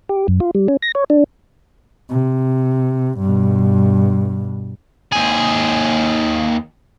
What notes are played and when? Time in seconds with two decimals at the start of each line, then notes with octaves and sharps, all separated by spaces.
0.09 G4
0.28 F#2
0.40 F4
0.55 G3
0.68 C#4
0.82 A#6
0.95 C#5
1.10 D4
2.09 C3
3.19 G2 B2
5.12 D#2 G#4